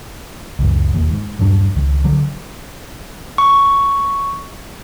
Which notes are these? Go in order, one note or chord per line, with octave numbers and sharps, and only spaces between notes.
C#2 F#2
E1 D#2
G#2
D#1 G2 F#3 D4
C#2 D#3
D3 F#3
C#6